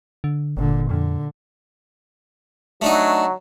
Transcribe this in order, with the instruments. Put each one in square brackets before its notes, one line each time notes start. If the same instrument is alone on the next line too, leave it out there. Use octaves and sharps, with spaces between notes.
[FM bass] D3
[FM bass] G1 [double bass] A#2 D3
[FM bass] F2 [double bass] D3
[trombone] F#3 [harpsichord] A3 D4 D#4